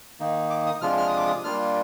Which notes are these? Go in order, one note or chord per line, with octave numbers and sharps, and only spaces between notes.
D#3 A#3 D#4
D6
D#6
C3 F3 G#3 D4 F4 F6
F6
D#6
D6
D#6
G3 A#3 D4 F4 F6